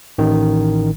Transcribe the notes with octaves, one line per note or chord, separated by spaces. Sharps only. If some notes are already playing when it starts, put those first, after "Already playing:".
A1 D#3